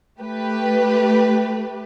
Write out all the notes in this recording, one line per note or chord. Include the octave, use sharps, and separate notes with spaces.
A3 G4 B4